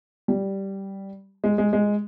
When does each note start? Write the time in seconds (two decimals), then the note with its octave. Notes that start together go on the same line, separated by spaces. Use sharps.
0.28 G3
1.44 G#3
1.58 G#3
1.73 G#3